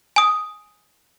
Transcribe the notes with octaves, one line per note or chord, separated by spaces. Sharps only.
G#5 D#6